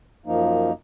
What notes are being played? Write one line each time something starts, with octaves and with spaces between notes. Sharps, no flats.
F#2 F3 A#3 D#4